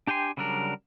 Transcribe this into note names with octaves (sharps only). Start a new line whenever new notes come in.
D4 G4 G5 G#5 C6
C#3 F#3 G3 D4 A#4